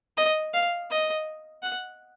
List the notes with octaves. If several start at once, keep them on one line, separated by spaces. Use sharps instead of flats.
D#5
F5
D#5
F#5